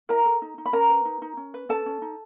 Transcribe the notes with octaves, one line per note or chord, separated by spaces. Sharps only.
E4 A#4 A#5
A4
D#4
D#4
B5
C#4 A#4 A#5
B4
D#4
D#4
C#4
B4
C#4 A4 A5
C#4
D#4